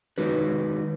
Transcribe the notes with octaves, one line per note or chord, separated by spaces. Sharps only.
D#3 G#3 D#4 F#4 B4